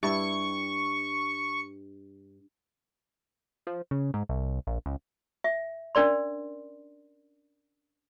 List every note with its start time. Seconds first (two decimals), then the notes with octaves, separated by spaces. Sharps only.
0.03 G2 E4 C#6
3.67 F3
3.91 C#3
4.14 G#2
4.29 C2
4.67 A#1
4.86 C#2
5.44 E5
5.95 C#4 D4 A#4 D5 C6